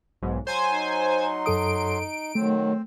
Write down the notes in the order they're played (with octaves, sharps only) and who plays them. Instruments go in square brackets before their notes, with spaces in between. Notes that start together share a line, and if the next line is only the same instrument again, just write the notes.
[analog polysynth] B1 G#2
[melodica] F#3 C6 [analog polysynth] C5 G#5
[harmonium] D#4
[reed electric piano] F#2 A4 D#6 [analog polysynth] D7
[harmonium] D#3 F#3 [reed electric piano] A3 [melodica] C4